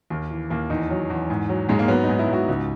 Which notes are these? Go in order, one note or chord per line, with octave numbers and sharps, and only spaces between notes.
D#2 A#3
E3
D#2 A#3
E2 D#4
F#3
E2
G#2
F#3
G#2 G#3
A#3
F#3 B3
G#2 D#4
E4
G#2
F#4
C#2